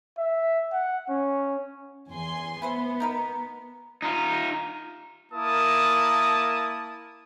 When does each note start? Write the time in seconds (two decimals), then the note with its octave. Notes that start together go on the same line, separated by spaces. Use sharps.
0.18 E5
0.72 F#5
1.09 C#4
2.11 E2 G#5 C6
2.62 B3 E4 B4 C5
3.00 D#4 A#4 B4
4.02 D#4 F4
5.32 A#3 E4 A#4 A5 D#6